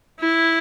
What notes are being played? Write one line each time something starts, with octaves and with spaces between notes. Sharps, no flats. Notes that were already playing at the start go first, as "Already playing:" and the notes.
E4